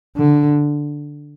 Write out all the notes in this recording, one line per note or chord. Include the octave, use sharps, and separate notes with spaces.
D3